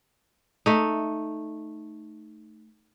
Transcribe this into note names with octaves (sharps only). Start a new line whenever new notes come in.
A3 D#4